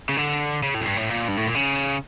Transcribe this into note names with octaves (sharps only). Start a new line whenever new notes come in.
C#3
D3
C#3
A2
F2
G2
A2
A#2
G2
A2
A#2
C#3